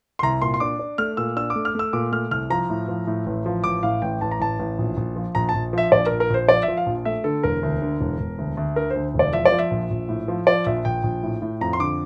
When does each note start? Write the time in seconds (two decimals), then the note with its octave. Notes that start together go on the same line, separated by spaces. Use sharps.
0.19 C6
0.23 C2 A#5
0.42 A#2 C6
0.54 C6
0.60 D4 D6
0.79 D4
0.98 A3 F6
1.17 A#2 E6
1.37 D4 E6
1.50 D6
1.56 A3
1.65 F6
1.75 A3 E6
1.93 A#2 D6
2.12 A3 F6
2.31 C2 F6
2.50 F3 A#5
2.70 A2
2.88 F3
3.07 A2
3.26 A1
3.46 F3
3.64 A1 D6
3.83 A2 F5
4.02 A1 G5
4.21 A1 A5
4.31 A#5
4.40 A1 A5
4.59 A1
4.79 A#1
4.97 A#1
5.16 F3
5.35 A#1 A#5
5.49 A5
5.54 A#1
5.73 F3 E5
5.92 A#1 D5
6.06 A#1 A#4
6.20 A#4
6.30 A#1 C5
6.49 F3 D5
6.63 E5
6.68 F3
6.77 F5
6.86 A#1
7.05 A3 E5
7.24 D3 A4
7.43 E1 A#4
7.63 D2
7.82 D3
8.01 E1
8.19 E1
8.38 D2
8.57 D2
8.76 D3 A#4
8.90 C5
8.95 D2
9.14 E1
9.19 D5
9.33 F3 E5
9.45 D5
9.52 F3
9.59 E5
9.71 A#1
9.90 A#1
10.09 A2
10.28 F3
10.47 F3 D5
10.66 A#1 E5
10.85 A#1 G5
11.04 A#1
11.23 A2
11.42 A2
11.61 F2 A#5
11.73 C6
11.79 D3 D6